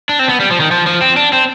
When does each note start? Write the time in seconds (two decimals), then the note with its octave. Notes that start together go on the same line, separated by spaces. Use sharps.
0.09 D4
0.19 C4
0.29 B3
0.40 G3
0.51 F3
0.60 D#3
0.71 F3
0.86 F3
1.02 C4
1.17 D4
1.33 C4